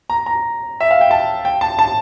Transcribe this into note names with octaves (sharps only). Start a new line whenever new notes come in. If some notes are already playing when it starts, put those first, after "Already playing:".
A#5
A#5
E5
F5
G5
A5
G5
A5
A5